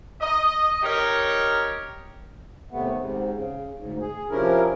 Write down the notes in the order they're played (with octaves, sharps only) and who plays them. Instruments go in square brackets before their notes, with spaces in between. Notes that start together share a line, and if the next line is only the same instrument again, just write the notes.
[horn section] D#5
D#4 G4 A#4 C#5
[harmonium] D#2 C3 A3 B3
G#2 C3
C#3
D2 G#2
G#4
C3 F3 C#4 D4 E4 A#4